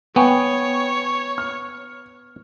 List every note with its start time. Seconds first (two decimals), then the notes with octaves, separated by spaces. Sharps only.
0.16 B3 C#5 G5 G#5 C#6
1.38 F6